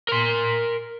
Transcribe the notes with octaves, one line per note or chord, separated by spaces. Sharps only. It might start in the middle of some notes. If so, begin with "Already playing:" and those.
A#4 C6